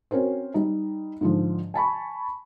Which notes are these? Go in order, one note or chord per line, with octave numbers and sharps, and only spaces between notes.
C4 C#4 F#4 A#4 C5
G3 D#4
G#2 D3 F3
G#5 A5 B5 C#6